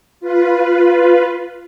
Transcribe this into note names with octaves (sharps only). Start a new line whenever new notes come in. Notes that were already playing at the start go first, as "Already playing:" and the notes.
F4 B4